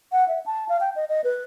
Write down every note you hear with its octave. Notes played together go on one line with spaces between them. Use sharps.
F#5
E5
A5
F5
G5
D#5
D#5
B4